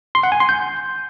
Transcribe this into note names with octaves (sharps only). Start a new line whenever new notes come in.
C6
F#5
G#5
C6
G6